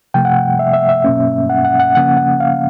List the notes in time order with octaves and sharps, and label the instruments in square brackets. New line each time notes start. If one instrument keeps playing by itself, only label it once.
[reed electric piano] C3 F3 A3 G5
F#5
E5
E5
E5
B2 F#3 A#3 C#4
F#5
F#5
F#5
C#3 F3 A#3 C#4 F#5
F#5
F5